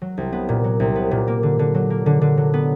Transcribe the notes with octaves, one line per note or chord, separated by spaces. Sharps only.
F#3
C2
B3
A#2
F#3
C2
B3
A#2
A#3
D3
D3
F#3
A#3
D3
D3
F#3
B3